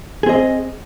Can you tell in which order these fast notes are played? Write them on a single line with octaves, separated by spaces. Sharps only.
G#4 C4 D#5